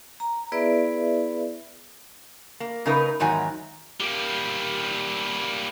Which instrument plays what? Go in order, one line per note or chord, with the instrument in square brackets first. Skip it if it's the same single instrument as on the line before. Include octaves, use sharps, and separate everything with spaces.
[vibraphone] A#5
B3 E4 G#4 B4 D5 E5
[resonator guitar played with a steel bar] A#3
C#3 A#3 D#4 A#4 B4
E2 G#2 D#3 F#3 G#5
[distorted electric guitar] G3 A#3